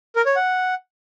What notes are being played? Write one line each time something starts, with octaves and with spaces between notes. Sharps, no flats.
A#4
C#5
F#5